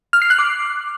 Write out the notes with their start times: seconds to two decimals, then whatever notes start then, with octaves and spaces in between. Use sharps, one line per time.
0.13 F6
0.22 C7
0.30 F#6
0.39 D6